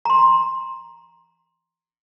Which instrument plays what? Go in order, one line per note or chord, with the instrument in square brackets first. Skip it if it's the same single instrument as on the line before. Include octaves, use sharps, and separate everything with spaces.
[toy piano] A#5 C6